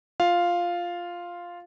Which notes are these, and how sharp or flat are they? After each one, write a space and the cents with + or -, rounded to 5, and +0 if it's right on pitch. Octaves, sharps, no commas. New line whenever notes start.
F4 +0 F5 +0